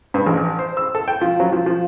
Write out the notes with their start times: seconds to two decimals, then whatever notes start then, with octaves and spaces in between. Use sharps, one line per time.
0.14 G2
0.26 A1
0.59 C5
0.77 E6
0.95 A4
1.08 G5
1.21 F3
1.40 F#3
1.52 F3
1.66 F3